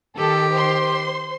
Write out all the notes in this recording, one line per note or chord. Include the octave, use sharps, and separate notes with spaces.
D#3 G4 A4
C5 C6